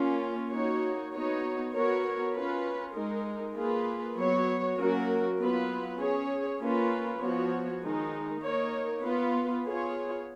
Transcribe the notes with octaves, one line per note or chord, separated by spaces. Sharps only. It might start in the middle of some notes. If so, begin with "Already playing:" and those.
Already playing: A#3 C#4 F4
A#3 D#4 F#4 C#5
B3 D#4 F#4 C#5
B3 F#4 A#4 C#5
C#4 F4 B4
G#3 D#4 A#4
A#3 F4 G#4 B4
F#3 B3 F#4 C#5
F#3 A#3 C#4 F#4 A#4
F#3 B3 F4 B4
C#4 G#4 C#5
A#3 C#4 F4 B4
F3 B3 F#4 C#5
D#3 G#3 D#4
A#3 D#4 A#4 C#5
B3 F4 B4
B3 F4 G#4 C#5